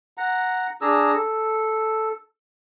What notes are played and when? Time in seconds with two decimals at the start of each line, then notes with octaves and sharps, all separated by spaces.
0.17 F#5 A#5
0.81 D4 G#4 A#5 E6
1.13 A4